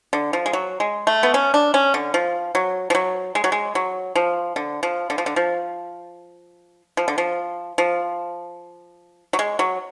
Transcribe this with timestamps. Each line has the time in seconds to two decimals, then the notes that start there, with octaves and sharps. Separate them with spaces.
0.13 D3
0.33 F3
0.46 G#3
0.53 F#3
0.80 G#3
1.07 A3
1.23 B3
1.34 C#4
1.54 D4
1.74 C#4
1.94 D3
2.14 F3
2.55 F#3
2.90 F3
2.95 F#3
3.35 G#3
3.44 F#3
3.52 G#3
3.75 F#3
4.16 F3
4.56 D3
4.83 F3
5.10 D3
5.18 F3
5.26 D3
5.36 F3
6.97 F3
7.08 D3
7.18 F3
7.78 F3
9.33 F#3
9.39 G#3
9.59 F#3